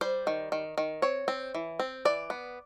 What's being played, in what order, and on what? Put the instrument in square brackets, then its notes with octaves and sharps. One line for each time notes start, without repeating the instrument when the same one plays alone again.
[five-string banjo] G3 C5
D#3
D#3
D#3
C4 C#5
C4
E3
C4
E3 D5
B3